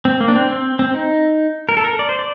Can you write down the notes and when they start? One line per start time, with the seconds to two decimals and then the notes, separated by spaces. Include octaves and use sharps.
0.05 C4
0.21 A#3
0.28 D4
0.36 C4
0.50 C4
0.79 C4
0.94 D#4
1.69 A#4
1.77 A4
1.84 A#4
1.99 D5
2.09 C5
2.19 D5